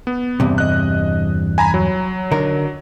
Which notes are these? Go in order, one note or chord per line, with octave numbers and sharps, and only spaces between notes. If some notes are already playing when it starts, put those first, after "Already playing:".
B3
E2 G2 C3
D#5 F#6
G#5 A#5 B5
F#3
D3 D#4 A#4